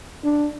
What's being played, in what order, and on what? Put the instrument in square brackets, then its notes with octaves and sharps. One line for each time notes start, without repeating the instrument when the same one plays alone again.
[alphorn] D4